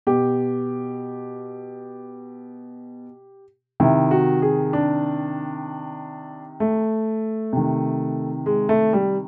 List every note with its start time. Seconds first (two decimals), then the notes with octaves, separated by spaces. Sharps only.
0.07 B2 G4
3.80 C3 D#3 E4
4.11 F#4
4.42 G#4
4.73 D4
6.60 A3
7.53 C3 D#3
8.46 G#3
8.69 A3
8.93 G3